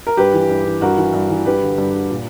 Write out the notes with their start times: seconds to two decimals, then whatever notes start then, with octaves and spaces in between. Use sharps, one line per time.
0.07 A#4
0.17 G2 G4 B4
0.34 E3
0.50 G2
0.65 E3
0.81 G2 F#4 A#4
0.98 E3
1.14 G2
1.30 E3
1.45 G2 G4 B4
1.62 D3
1.78 G2
1.93 D3
2.10 A#2